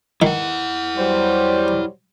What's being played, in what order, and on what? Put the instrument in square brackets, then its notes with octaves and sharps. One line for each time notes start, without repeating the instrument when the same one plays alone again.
[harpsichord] D#3 [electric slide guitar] E4 F#5
[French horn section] F#3 G3 [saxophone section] C5